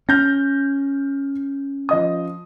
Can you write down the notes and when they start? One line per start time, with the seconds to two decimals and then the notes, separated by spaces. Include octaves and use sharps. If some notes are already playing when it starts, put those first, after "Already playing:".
0.09 C#4 F6 G6 A#6
1.89 F3 D#5 D#6